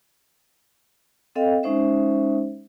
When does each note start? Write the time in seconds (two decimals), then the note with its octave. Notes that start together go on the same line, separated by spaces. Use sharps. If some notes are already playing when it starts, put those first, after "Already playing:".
1.36 C4 A4 D#5 F5 G5
1.63 G#3 C#4 D#4 C5 E5